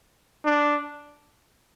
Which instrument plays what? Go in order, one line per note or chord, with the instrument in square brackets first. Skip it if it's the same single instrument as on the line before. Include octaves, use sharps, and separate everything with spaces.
[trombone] D4